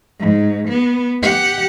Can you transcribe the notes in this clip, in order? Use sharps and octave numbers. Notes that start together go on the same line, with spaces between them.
G#2
B3
G4 F#5